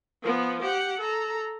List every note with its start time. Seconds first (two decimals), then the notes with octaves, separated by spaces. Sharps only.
0.23 F3 B3
0.62 G4 F#5
0.99 A4 A#5